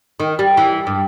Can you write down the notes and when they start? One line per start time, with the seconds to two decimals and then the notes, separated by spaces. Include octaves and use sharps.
0.20 D#3
0.39 G3
0.57 E3
0.87 G2